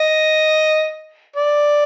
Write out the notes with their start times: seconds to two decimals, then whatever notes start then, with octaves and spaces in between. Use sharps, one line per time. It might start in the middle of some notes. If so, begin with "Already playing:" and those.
Already playing: D#5
1.36 D5